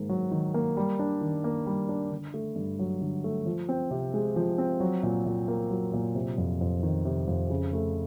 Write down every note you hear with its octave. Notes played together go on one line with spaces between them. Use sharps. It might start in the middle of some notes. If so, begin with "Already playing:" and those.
Already playing: G#2 D#3 A#3
F#3
D#3
A#3
G3
D4
D#3
A#3
G3
D4
D3
A3
G2
F#3
D3
A3
F3
C4
C3
G#3
F3
C4
F#3
A#2
A#2
A#3
F#3
A#2
C3
F2
F2
D#3
C3
F2
C#3
A3